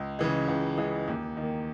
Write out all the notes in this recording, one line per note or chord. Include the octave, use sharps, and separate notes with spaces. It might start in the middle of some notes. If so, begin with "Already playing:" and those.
Already playing: C#2
C#3 E3 G#3
C#2
C#3 E3 G#3
D#2
D#3
A#3